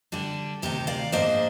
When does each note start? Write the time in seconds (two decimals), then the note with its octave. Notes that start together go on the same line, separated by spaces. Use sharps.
0.12 D3 G3 D4 G4
0.62 D2 C3 D#3 G4
0.87 D5 F5
1.12 G#2 F3 A#3 D4 C5 D#5